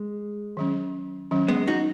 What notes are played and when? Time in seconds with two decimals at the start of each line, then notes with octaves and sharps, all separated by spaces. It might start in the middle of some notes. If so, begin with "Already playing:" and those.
Already playing: G#3
0.57 D#3 F#3 C#4
1.31 D#3 F#3 C#4
1.48 G#3 B3
1.67 D#4 F#4